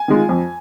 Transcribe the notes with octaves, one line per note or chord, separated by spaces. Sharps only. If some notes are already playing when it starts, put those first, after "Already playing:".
Already playing: G#5
D#3 G#3 F4
F2